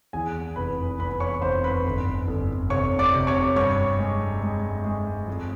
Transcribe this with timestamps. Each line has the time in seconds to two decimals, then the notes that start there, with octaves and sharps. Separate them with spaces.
0.13 E2 G#4 G#5
0.56 F1 B4 B5
0.99 F1 B4 B5
1.20 C#5 C#6
1.42 F1 C5 C6
1.64 B4 B5
1.85 G1
2.28 G1
2.70 C3 C#5 C#6
2.99 D5 D6
3.14 C3
3.27 C#5 C#6
3.56 G2 C#5 C#6
3.99 G#3
4.42 G#3
4.85 G#3
5.28 F2